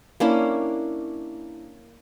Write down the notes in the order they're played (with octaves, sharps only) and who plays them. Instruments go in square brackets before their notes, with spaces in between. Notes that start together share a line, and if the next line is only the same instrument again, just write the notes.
[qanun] A#3 C#4 D4 E4